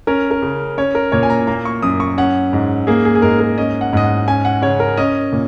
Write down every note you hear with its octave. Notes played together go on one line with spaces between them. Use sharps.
C#4 A#4
A#4
C#3
C#4 C#5
A#4
A#2 C#5
G#5
A#5
A#3 A#5
C#6
F#2 D#6
C#6
C#4 F#5
G#2
A#3 G#4
G#4
G#4
G#2 A#4
A#4
C#4 D#5
F#5
G#2 D#5
F#5
C#4 G#5
F#5
C#3 C#5
A#4
C#4 D#5
A#2